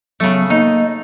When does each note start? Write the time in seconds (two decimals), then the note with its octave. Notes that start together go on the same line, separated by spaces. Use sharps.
0.20 C#3 F#3 A3 B3
0.50 A#3 D#4 D#5